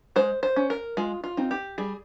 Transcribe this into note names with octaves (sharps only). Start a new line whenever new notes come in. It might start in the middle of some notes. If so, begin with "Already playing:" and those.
G#3 C5
C5
C#4
A#4
G#3 F4
F4
C4 D#4
G4
G3 G#4